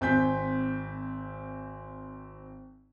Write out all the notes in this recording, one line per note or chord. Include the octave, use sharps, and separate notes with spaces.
G#1 C4 G#5 G6 B6